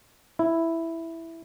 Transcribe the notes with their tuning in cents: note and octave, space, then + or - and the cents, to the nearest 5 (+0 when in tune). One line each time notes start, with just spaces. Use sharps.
E4 +0